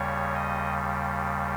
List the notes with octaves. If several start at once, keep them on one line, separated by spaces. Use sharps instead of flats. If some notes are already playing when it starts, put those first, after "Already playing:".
Already playing: D#2 C#3 G3 C#5
D#5